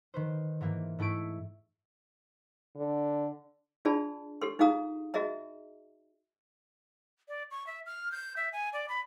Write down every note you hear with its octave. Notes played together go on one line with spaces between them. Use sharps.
D#3 B4 C5
G#2 E3 A#3
G#2 A3 E4 C#6 D7
D3
D4 F4 G#4 D5 A5 B5
G4 A4 C6
D#4 F4 G#4 F5 A#5 D#6
F#4 G#4 D#5 E5 A#5
D5
C#6
E5
F6
G6
E5
G#5
D5
B5